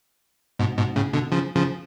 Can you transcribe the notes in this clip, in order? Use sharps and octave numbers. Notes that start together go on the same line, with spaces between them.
G#2 B2
G#2 B2
A2 C#3
B2 D3
C#3 F3
C#3 F3